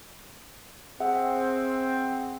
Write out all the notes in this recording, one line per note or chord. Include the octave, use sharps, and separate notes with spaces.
C4 G#4 E5 F#5